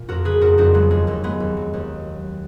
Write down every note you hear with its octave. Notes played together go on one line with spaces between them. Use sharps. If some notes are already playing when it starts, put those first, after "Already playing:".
Already playing: A#2
F2 F#4 A#4
C#3 G#4 B4
F2 F#4 A#4
F2 D#4 F#4
F#3 G#3 B3
D#2 G#3
D#2 A#3
D#2 G#3 B3
D#2
F#3
D#2